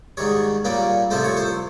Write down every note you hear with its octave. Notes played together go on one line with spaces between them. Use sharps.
G#2 D#3 G3 C#5
A#2 G3 A#3 C#4
C2 C3 F3 A3 C5
C#5
C5